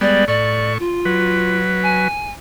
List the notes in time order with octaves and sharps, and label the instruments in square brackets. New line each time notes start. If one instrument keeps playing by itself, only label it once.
[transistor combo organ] G3 G#3 B3 [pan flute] D5
[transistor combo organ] A2 C#6 [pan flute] D5
[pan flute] F4
[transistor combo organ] F#3 B4
[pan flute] G#5